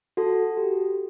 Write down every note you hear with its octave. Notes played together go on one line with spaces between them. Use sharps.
F#4 A4
G4